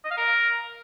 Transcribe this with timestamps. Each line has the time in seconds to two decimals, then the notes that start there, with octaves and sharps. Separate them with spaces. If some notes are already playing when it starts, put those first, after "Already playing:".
0.04 D#5
0.11 F5
0.17 A#4